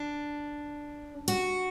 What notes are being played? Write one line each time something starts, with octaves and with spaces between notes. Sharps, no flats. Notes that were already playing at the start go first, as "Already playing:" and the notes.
Already playing: D4
F#4